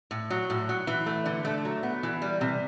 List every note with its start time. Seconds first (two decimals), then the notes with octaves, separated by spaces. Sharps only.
0.11 A2
0.30 F#3
0.50 A2
0.69 F#3
0.87 E3
1.06 A3
1.25 D3
1.45 A3
1.65 F#3
1.83 B3
2.03 E3
2.22 G3
2.41 C3